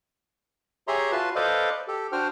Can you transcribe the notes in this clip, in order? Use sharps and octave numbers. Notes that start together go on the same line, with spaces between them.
G4 G#4 C#5 E5 A#5 C6
F4 F#4 B4 A5 C6
A4 B4 C5 D5 D#5 F5
G4 A4
D4 F#4 C5 G5 F6